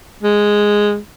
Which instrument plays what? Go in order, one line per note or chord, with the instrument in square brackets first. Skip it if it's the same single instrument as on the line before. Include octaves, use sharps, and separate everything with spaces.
[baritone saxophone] G#3